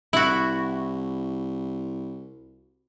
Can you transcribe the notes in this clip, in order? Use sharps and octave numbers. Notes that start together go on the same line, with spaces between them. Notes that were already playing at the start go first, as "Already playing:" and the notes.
C2 E4 F#4